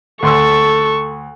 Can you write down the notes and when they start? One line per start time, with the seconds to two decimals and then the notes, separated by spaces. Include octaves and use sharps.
0.23 D2 A4 C6 C#6 E6